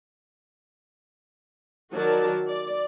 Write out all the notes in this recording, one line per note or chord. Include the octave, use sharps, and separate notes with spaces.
D#3 F#3 F#4 A#4 D5 A5
D5